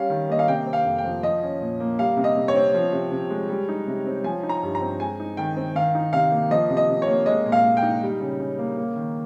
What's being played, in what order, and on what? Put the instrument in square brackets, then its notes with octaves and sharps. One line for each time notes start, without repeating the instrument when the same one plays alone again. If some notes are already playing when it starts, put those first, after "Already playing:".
Already playing: [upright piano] G3 C#4 F5
D#3
A#3 D#5
F5
C3 G5
C4
F5
F2
G5
F3
F3 D#5
C#4
A#2
A#3
G3 F5
C3
D#5
C3
C#5
C4
F3
C3
C3
G#3
G3
D#4
C3
C4
F3 G#5
D#4
A#5
G2
A#5
C4
G#3 G#5
D#4
D#3 G5
C4
D#3 F5
D#4
C3 F5
A#3
F3 D#5
C3
D#5
C3
C#5
A#3
G#3 D#5
A#2
F5
A#2
G5
D#4
G3
C#3
C#3
A#3
A#3
D#3